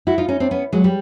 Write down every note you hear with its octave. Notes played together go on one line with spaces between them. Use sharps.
E4 F#4
D#4 F4
C#4 D#4
C4 D4
B3 C#4
F#3 G#3
G3